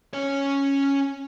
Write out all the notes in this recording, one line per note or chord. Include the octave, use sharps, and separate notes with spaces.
C#4 C#5